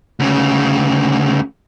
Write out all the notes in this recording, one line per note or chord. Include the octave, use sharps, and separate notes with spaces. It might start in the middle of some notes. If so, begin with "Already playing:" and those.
D2 C#3